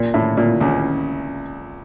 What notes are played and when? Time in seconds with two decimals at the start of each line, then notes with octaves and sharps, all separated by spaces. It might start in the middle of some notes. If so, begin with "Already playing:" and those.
Already playing: A#2
0.14 A2
0.37 A#2
0.60 C#2 C#3